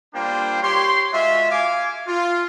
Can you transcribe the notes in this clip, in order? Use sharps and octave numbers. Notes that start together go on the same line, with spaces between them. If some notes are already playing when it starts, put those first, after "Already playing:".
G3 A#3 D4 F4 C5 G5
G4 C#5 C6
G#3 F4 F#4 E5
F5 G#5 D6
F4